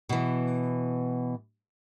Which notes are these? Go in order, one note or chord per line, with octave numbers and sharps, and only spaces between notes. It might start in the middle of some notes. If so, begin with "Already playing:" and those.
B2 E3